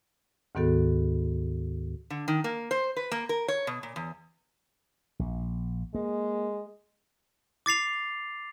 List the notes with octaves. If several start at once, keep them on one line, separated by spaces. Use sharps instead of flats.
D2 G#2 D#3 B3 F#4 A4
D3
D#3
A#3
C5
B4
A#3
A#4
C#5
B2
A#2
E2
A#1
G#3 A#3
D6 A6 C7 F7